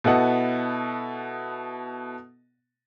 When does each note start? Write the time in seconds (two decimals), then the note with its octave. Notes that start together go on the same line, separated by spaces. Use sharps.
0.04 B2 B3 E4 A4 D#5 F#5